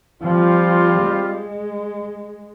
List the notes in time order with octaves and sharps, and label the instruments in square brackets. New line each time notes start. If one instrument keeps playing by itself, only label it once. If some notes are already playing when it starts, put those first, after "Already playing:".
[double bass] F3 [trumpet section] G3 C4 F4
[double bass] G#3